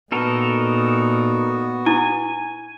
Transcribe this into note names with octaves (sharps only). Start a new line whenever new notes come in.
A#2 B3 D#4 F#4 A4 A#4
E4 G#5